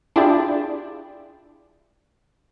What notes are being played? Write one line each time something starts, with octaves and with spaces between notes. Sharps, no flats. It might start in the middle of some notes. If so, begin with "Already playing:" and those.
D4 E4 F4 G4 G#4 D5